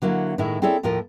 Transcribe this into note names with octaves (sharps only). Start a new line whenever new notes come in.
D3 F#3 A#3 E4
A2 D#3 G#3 E4
C4 E4 G#4 A4 C#5 D5
D#2 A2 F3 F4 A#4